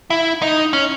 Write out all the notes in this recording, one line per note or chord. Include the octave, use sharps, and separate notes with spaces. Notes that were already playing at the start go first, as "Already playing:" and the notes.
E4
D#4
C#4